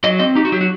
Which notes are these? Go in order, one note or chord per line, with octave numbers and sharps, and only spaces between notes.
F#3 D#5
C4 D#5
D#4 G4
F#4
F#3 G4
F#4